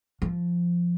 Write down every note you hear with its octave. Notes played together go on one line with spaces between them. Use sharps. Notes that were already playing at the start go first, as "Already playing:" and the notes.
F3